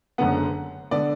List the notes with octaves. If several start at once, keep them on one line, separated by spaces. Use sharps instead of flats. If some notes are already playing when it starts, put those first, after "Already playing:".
F#1 F#2 D3 B3 F#5
D3 B3 D5